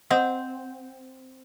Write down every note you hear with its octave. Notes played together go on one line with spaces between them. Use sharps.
C4 D#5 F#5 G6